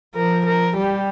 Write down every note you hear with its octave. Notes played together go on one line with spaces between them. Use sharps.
F3 A#4
A#4
G3 G4